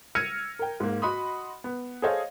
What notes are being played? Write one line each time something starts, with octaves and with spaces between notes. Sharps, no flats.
E6 F6 G#6 A#6 C#7 D#7
A#4 G5
G#2 A#3
F#4 D#5 F#5 B5 C6 D#6
B3
G#4 A4 C5 C#5 D#5 F5